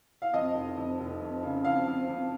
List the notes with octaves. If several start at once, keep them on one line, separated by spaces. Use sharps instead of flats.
F5
F2 D#5
F1
F2
F1
F2
C#3
F2 F5
F2
F2